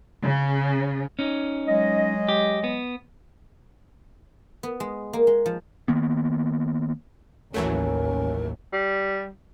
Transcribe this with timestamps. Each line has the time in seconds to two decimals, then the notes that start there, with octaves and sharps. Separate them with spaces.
0.23 C#3
1.19 C#4 D#4
1.67 F#3 G#3 D#5
2.29 G4
2.64 B3
4.63 B3
4.80 G#3
5.13 A#3
5.27 G#3
5.46 F3
5.88 D#3 A#3 B3
7.54 A1 D#2 E3 F#3 A3 C#4 A#4
8.73 G3